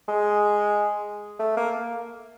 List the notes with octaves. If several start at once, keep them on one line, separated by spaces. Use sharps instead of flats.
G#3
A3
A#3